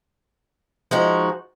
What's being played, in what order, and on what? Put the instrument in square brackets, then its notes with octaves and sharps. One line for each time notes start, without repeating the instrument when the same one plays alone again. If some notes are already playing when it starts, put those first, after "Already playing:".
[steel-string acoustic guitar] F3 G#3 D#4 F#4